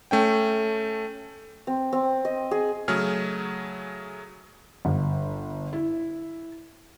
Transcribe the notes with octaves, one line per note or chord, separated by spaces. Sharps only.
A3 C#4 G5
C4
C4
D#5
G#4
C#3 F#3 A3 G#4 F6
G1
E4